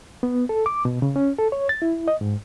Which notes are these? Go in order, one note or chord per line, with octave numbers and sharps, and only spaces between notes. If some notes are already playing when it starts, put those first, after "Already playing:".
B3
A4
D6
B2
C#3
C#4
A4
C#5
A6
E4
D#5
G#2